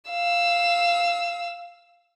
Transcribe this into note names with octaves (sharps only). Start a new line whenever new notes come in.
F5 E6